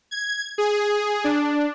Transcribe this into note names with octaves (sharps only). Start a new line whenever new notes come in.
G#6
G#4
D4